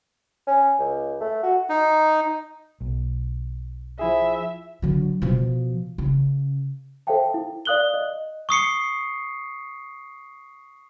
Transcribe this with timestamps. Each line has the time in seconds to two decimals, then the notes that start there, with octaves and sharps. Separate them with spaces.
0.47 C#4
0.79 C#2
1.21 A3
1.43 F#4
1.69 D#4
2.81 B1
3.99 F3 E4 G#4 E5
4.82 D3 F#3
5.22 B2 F3
5.98 C#3
7.07 A4 C5 E5 F5 G5 A5
7.34 E4
7.65 D5 F5 D#6 F#6 F#7 G7
7.94 D#5
8.49 C#6 D#6 C7 C#7